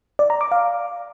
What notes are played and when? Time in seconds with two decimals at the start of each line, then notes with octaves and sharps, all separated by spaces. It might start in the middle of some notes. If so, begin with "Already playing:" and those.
0.19 D5
0.30 A#5
0.41 D6
0.52 F5